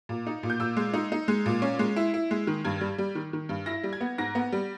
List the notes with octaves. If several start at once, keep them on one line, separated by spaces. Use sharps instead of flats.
A#2
D#4
A#2
G6
A#2 E6
G#3
D#4
D#4
G#3
A#2
C#4
G#3
E4
E4
G#3
D#3
G2 G#6
G3
G3
D#3
D#3
G2
E4 A#6
G3
G#6
B3
G#2 A#6
B3
G3